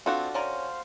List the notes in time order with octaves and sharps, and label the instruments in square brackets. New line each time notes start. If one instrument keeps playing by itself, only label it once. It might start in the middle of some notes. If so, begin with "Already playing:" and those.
[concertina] C4 C5 [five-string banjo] D4 F#4 A4 [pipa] F4
[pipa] C#4 D5 A#5 [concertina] C5 F5